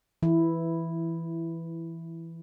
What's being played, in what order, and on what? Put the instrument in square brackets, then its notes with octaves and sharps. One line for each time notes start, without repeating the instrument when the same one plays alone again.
[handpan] E3 E4